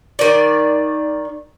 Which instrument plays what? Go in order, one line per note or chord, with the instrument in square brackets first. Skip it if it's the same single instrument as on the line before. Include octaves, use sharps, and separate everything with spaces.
[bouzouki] D#3 D5